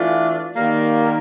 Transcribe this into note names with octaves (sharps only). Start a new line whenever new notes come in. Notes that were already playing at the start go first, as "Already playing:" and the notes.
Already playing: E3 A3 D4 F4
D#3 G3 A#3